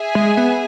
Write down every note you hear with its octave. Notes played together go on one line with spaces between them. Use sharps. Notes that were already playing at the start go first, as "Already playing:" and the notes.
Already playing: G#4 E5 G#5
G#3
B3